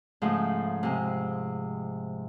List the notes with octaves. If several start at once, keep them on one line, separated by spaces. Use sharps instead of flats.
G#2 C#3 F3 A3 D#6
C3 G#3